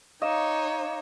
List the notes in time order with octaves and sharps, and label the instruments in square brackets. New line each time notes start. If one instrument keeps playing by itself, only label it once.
[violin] D#4 C#5 [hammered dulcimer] D#5 [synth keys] F5 D6 E7